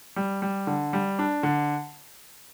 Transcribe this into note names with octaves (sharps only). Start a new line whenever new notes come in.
G3
G3
D3
G3
D4
D3